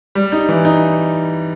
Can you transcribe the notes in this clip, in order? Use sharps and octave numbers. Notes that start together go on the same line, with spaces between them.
G3
D#4
E3
D#4